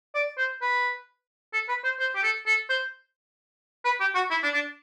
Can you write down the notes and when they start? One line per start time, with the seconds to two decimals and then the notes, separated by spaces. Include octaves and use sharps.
0.15 D5
0.38 C5
0.61 B4
1.53 A4
1.69 B4
1.84 C5
2.00 C5
2.15 G4
2.23 A4
2.46 A4
2.69 C5
3.85 B4
4.00 G4
4.15 F#4
4.31 E4
4.43 D4
4.53 D4